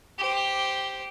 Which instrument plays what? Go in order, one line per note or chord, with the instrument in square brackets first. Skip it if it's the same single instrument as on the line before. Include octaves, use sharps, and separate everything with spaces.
[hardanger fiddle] G4 C5